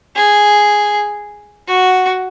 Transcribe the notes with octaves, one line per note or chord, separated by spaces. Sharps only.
G#4
F#4